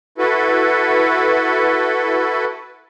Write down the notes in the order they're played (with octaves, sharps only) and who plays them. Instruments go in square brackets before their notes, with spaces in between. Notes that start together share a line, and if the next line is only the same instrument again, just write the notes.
[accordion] E4 F#4 A4 B4